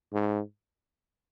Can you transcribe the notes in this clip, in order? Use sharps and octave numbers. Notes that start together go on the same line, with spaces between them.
G#2